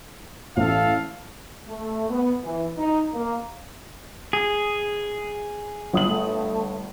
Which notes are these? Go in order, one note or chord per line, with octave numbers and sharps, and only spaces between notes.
A1 A4 F5
A3
B3
E3
D#4
A#3
G#4
G1 D#6 F#7
A3